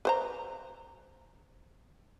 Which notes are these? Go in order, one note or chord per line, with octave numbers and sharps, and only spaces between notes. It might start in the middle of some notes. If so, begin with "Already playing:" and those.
B4 C5 A#5